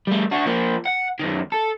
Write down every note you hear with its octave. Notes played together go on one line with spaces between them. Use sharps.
G3 A3
D4 F#4
F3 A#3
F#5
F#2 D#3
A4